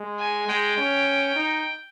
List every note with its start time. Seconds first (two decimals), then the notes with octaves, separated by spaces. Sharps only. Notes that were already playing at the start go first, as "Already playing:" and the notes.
Already playing: G#3
0.19 G#5
0.49 G#3 G5
0.78 C#4
1.36 D#4